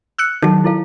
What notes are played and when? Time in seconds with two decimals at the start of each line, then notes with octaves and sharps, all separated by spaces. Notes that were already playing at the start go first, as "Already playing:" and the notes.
0.19 E6 F#6 C#7
0.43 D#3 F#3 D#4 G4 A4
0.64 E4 A4 F5